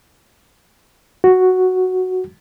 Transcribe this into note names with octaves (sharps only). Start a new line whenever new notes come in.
F#4